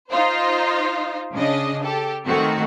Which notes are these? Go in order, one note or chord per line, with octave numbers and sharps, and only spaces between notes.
D#4 F4 C5
C#3 D4 D#5
G4 A4
D#3 A3 C4 F#4